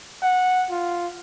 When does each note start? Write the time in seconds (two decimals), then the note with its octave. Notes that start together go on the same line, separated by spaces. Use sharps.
0.22 F#5
0.71 F4